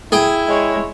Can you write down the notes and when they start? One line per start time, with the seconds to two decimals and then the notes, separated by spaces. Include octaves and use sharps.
0.12 E4 G#4 G5
0.48 G#3 C#5